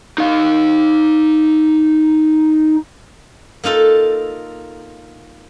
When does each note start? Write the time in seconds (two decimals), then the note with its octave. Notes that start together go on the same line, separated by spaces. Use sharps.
0.18 D#4 F5
3.64 A#3 D#4 F4 A4